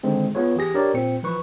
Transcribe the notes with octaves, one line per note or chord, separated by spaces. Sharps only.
D3 D#3 G#3 C4
B3 F4 G#4 B4 C#5
E3 G4 G#4 A#6
D4 G4 A#4 C#5 D5
A#2 C4 C#7
E3 F3 B4 C#6